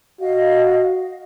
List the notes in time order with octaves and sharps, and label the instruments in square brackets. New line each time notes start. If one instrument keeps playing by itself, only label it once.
[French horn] F#4 [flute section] D#5 F5